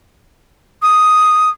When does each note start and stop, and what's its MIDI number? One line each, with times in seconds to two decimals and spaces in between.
0.82 1.50 87